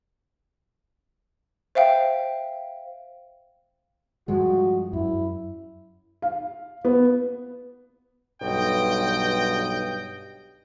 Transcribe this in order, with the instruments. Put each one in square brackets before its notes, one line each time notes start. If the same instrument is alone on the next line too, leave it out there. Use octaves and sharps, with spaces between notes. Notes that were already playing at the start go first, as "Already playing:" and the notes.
[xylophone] C5 E5 F5 G5
[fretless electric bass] G2 F3 G#3 [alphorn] F#4
[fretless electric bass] F#2 [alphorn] E4
[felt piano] F5
B3
[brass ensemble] B1 G2 D#5 G5